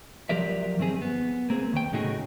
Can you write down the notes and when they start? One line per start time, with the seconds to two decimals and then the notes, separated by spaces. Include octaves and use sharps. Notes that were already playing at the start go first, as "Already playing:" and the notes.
0.29 F3 F#3 G4 A#4 D5 E5
0.78 G2 D#3 C4 G#4
1.02 B3
1.50 A#3 C4 G#4
1.73 D#2 G5
1.92 A2 C#3 A3 D#4 F#4 G#4